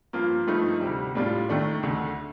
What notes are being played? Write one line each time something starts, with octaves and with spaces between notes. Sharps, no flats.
G2 F3 A#3 F4
G2 F3 A3 D#4
D2 C3 G3
A2 G3 D4 F4
D#2 D#3 A3 D4
D2 D3 A3